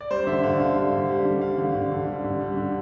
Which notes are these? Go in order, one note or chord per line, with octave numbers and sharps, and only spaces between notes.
D5
G3 C5
D3 E5
D3 F5
D3 F5
G3
D3
G3
D3
G3 F5
D3
D3
D3
G3
D3
G3
D3